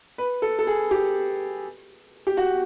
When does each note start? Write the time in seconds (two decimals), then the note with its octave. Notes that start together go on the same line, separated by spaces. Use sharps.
0.18 B4
0.42 A4
0.59 A4
0.67 G#4
0.91 G4
2.27 G4
2.37 F#4